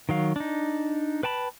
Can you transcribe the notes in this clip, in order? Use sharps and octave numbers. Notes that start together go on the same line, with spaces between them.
D#3 F#3 F5
D4 D#4
B4 G5 A5 B5